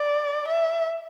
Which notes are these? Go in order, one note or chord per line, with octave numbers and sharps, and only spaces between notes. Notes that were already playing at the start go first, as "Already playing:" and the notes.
Already playing: D5
E5